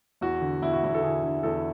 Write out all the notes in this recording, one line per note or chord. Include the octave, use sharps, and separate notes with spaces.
E2 F#4
D3
E2 E4
F#4
E2 E4
A4
D3 G#4
D3
E2 A4